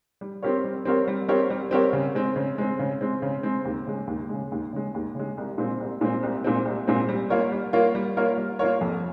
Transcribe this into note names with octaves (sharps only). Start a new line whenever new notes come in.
G3
C4 G4 A#4 C#5
G3
C4 G4 A#4 C#5
G3
C4 G4 A#4 C#5
G3
C4 G4 A#4 C#5
C#3
G#3 C4
C#3
G#3 C4
C#3
G#3 C4
C#3
G#3 C4
D#2
C#3 G#3
D#2
C#3 G#3
D#2
C#3 G#3
D#2
C#3 G#3
C2
A#2 G#3 C4
C2
A#2 G#3 C4
C2
A#2 G#3 C4
C2
A#2 G#3 C4
G3
A#3 F4 A#4 C#5
G3
A#3 F4 A#4 C#5
G3
A#3 F4 A#4 C#5
G3
A#3 F4 A#4 C#5
F2